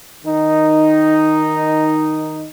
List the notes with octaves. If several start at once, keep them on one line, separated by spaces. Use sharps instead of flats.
D#3 D#4